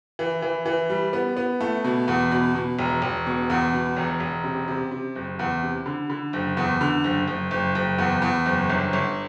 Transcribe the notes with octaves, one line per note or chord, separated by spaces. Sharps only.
E3
E3
E3
G3
B3
B3
A3
B2
E2
B2
B2
E1
E1
B2
E2
B2
E1
E1
C3
C3
C3
F#1
E2
C3
D3
D3
F#1
E2
D3
F#1
F#1
F#1
F#1
E2
E2
F#1
G1
G1